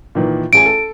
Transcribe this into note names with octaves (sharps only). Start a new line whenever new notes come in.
A#2 D#3 E3
A1 G#4 G#5 D7
A4